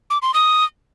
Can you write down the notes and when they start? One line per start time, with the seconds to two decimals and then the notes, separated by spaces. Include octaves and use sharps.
0.10 D6
0.22 C6
0.34 D#6